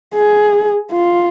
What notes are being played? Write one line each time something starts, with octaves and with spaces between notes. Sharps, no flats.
G#4
F4